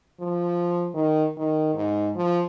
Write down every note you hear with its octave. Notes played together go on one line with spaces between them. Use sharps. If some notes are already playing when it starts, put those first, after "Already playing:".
F3
D#3
D#3
G#2
F3